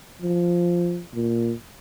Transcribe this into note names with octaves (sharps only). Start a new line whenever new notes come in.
F3
A#2